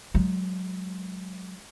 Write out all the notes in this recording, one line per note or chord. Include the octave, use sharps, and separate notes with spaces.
F#3 G#3